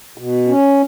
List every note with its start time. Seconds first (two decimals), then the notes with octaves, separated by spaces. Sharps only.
0.18 B2
0.47 C#4